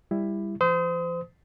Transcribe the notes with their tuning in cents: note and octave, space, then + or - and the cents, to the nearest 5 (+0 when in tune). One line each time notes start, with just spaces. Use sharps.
G3 +20 E4 +10
F3 -45 C5 -30 D#6 +25